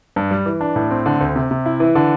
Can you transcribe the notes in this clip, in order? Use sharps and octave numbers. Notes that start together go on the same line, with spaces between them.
G2
G3
E3
D4
A2
C4
D3
D2
C3
C3
E4
E3
D3